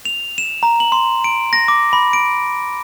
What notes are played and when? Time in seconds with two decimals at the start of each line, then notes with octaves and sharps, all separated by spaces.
0.05 F7
0.38 E7
0.63 A#5
0.80 F#7
0.92 C6
1.24 D7
1.53 A#6
1.68 D6
1.93 B5
2.13 D7